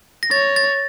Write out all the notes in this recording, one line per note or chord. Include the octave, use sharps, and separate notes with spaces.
A#6
C#5 A6
A6